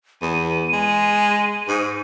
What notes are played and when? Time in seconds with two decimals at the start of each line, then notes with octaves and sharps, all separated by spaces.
0.22 E2 D#7
0.73 G#3
1.68 G#2